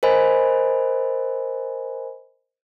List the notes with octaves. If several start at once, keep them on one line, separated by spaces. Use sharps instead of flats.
A#4 C5 D#5 G#5 B5